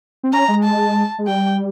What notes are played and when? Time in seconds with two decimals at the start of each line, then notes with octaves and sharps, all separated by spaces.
0.23 C4
0.33 C#4 A#5
0.48 G#3
0.64 A5
1.19 G#3
1.27 G3 G5